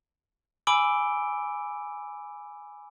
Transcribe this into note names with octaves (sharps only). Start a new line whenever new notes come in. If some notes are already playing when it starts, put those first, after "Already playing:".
G#5 B5 D6 E6 D7 G7